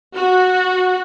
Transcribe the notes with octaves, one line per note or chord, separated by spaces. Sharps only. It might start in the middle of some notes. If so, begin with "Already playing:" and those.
F#4